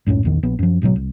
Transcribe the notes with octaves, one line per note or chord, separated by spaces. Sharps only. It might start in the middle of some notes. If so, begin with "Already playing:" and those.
C#2 F#2 A2 C#4
A#1 E2 D#3
A#1 B3
F#2 F3
G#1 B2 D3 F#3
C2